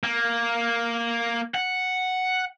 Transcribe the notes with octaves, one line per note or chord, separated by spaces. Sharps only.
A#3
F#5